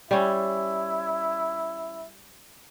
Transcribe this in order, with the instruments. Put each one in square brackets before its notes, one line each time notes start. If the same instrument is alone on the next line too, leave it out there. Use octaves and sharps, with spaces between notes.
[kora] G3 C#4 [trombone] E4